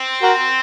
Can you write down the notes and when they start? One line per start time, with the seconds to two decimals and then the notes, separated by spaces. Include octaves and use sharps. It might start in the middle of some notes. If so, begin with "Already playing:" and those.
Already playing: C4
0.23 F#4 A#4